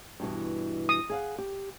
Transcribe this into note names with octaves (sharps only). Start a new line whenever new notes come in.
G2 B2 E3
D#6
G#4 F5 F#5
G4